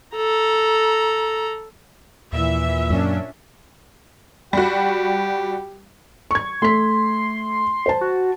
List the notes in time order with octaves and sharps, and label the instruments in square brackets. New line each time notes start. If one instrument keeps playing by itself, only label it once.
[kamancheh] A4 A#5
[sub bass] D#2 [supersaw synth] A#2 E3 [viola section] E5
[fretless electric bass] F#2 [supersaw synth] A#2 C#4 D4
[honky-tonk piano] G3 F#4 [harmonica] G4
[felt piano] C#6 G#6
[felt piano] A3 B6 [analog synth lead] C6
[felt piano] C5 A5
[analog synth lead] F#4